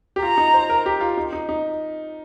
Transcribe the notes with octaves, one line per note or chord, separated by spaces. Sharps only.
G4
F4 A#5
D#4
C5
A#4
G4
F4
D#4
D#4
D#4